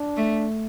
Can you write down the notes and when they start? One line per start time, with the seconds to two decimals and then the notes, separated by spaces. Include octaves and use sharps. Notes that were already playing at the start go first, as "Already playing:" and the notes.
Already playing: D4
0.17 A3